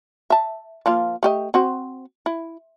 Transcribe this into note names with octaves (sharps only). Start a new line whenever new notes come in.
E5 A5
F3 A#3 F4
A3 G4 D#5
C4 F#4 C5
E4